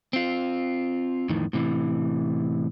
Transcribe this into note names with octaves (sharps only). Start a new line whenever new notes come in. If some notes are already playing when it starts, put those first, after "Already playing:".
C4 F4
F2 A2 D#3 E3
A2 C3 E3